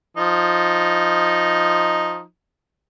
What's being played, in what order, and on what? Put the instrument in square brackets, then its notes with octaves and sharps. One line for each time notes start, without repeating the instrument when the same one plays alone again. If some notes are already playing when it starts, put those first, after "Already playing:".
[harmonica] F3 D#4